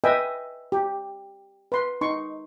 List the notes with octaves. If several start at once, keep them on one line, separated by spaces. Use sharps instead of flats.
B4 D#5 E5 G5 G#5
G4
B4 C6
D#4 C6 C#6